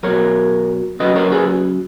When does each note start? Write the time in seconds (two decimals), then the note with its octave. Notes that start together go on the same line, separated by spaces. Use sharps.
0.03 B2 F#3 A#4 C#5
1.00 C#3 F#3 B4 D#5
1.16 A#4 C#5
1.32 G#4 B4